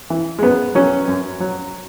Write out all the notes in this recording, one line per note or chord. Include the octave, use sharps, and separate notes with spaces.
E3
G#3
F#2 B3
F#3 C#4
F#2
F#3